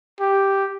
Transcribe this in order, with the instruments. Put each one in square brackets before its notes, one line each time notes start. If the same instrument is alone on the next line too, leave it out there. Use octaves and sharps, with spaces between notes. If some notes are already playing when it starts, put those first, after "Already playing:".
[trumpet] G4